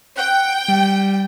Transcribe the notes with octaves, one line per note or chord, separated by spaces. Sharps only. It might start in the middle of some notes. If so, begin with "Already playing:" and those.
F#5 G5
G3